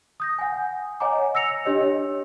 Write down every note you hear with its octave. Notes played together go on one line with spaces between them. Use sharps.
D#6 G6 A#6
F#5 G#5
C#5 D#5 F#5 G#5 A#5 D6
E6 A#6 C#7 F7
D4 G4 C#5 D#5